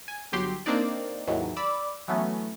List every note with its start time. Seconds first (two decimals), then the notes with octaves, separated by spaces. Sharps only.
0.08 G#5
0.32 G1 F#3 G4 C6
0.66 A#3 C4 D4 D#4 D5
1.27 D#2 G#2 D#3 E3 F#3
1.56 D5 B5 D6 E6
2.08 E3 F#3 A3 B3 C#4